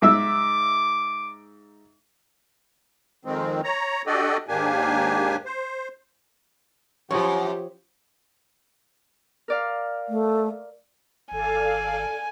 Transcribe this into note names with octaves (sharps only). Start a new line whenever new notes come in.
G#2 E5 D6 E6
F2 D#3 G#3 C4
C#5 A#5
D4 F#4 G4 A4 D5 D#5
D#2 G#2 A#3 D4 G4 G#5
C5
F#2 F3 G4 C#5
A#4 D5 F5
A3
G#1 A4 D5 F5 G#5